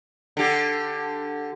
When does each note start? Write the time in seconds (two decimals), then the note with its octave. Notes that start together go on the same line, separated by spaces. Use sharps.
0.37 D3 G4